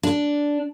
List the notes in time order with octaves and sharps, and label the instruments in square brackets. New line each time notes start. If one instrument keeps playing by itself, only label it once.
[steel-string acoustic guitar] D4